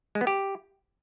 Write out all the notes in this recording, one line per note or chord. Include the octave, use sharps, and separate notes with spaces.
G#3
B3
G4